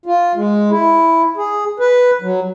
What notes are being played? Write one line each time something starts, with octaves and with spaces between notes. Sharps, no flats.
F4
G#3
E4
G#4
B4
F#3